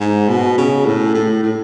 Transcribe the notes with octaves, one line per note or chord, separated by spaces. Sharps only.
G#2
B2
C#3
A2
A2
A2